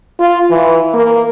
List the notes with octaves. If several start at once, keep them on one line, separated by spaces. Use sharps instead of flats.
F4
E3
A#3